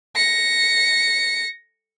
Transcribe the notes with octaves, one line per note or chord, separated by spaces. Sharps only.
A#6 C#7